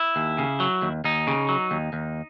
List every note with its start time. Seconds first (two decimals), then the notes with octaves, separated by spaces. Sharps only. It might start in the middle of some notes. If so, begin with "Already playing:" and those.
Already playing: E4
0.16 D#2
0.38 C#3
0.60 F#3
0.82 D#2
1.04 D#2 D#4
1.27 C#3
1.49 F#3
1.71 D#2
1.93 D#2